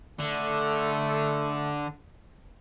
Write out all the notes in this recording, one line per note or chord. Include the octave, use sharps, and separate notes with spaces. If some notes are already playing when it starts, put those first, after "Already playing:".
D3 A3